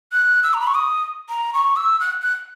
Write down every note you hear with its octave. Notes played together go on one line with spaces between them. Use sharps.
F#6
E6
A#5
B5
C#6
D#6
A#5
C#6
E6
F#6
F#6